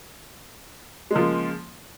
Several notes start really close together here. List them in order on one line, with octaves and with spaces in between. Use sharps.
G#3 A#3 F3 F4 C#3